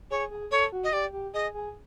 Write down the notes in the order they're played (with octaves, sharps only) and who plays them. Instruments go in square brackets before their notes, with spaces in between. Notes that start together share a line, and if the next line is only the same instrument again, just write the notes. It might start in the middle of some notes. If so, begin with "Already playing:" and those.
[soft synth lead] G#4 [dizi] C#5
[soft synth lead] G#4
[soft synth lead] A4 [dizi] C#5
[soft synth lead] F#4
[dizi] D#5
[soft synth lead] G4 [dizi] D5
[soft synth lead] G4
[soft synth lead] G#4 [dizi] D#5
[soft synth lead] G#4